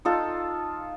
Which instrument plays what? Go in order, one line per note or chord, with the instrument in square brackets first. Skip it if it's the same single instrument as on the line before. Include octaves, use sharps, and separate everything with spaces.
[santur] D#4 F4 A4